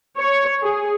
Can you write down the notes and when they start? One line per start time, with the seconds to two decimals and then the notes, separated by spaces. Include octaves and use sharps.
0.18 C#5
0.63 G#4